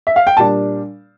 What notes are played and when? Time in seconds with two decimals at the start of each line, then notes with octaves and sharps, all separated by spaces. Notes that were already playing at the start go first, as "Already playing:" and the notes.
0.07 E5
0.16 F5
0.27 G5
0.37 A#2 G3 D4 A5